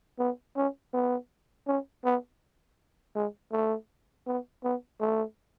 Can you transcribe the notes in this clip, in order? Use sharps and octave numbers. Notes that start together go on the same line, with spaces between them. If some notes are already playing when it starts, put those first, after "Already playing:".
B3
C#4
B3
C#4
B3
G#3
A3
B3
B3
A3